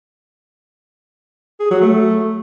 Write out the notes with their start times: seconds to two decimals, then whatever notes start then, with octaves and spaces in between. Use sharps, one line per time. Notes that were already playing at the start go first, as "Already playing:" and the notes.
1.60 G#4
1.70 F#3
1.81 A3